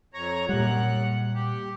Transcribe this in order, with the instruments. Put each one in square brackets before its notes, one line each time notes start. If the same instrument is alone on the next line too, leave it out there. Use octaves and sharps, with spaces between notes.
[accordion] F2 C#5 A#5
[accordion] F#2 F#5 [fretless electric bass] A#2 G3
[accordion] G4